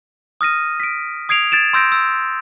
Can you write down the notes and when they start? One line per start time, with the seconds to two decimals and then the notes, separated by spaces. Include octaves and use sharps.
0.41 D#6 F6 A#6 D#7
0.80 B6 D7
1.29 D#6 G#6 C7 D7 F7
1.52 G#6 A6 D7 E7
1.73 C6 E6 G6 A#6 D7
1.92 E6